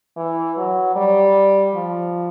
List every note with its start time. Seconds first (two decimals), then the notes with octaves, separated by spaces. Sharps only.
0.17 E3
0.57 F#3
0.96 G3
1.74 F3